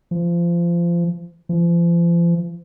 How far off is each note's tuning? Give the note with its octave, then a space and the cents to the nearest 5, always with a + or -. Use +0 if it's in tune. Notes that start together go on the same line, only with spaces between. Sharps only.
F3 -25
F3 -40